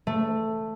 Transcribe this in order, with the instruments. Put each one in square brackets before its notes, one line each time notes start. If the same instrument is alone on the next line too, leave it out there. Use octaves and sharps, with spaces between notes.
[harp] A3